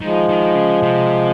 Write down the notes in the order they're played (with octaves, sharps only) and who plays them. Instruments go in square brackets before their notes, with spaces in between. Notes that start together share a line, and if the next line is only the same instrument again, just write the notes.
[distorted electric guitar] D#3 [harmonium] F3 G#3
[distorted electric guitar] D#3
C#3
C3